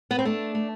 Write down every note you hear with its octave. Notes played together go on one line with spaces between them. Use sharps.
B3
C4
A3 D4
A3